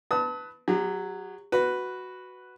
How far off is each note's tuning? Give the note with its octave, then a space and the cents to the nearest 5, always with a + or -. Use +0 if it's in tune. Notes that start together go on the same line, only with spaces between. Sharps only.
B4 +5 A5 +10 D#6 +45
F#3 +0 G4 +45
F#4 +0 B4 +0